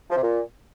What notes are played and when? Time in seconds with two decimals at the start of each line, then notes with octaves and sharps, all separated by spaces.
0.10 F3
0.16 C3
0.22 A#2